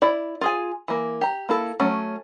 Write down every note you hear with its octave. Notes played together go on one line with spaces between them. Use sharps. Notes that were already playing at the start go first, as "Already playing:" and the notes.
E4 D5
F4 G#4 G#5
E3 A#3
G4 A#5
A#3 E4 A4
F#3 A3 C#4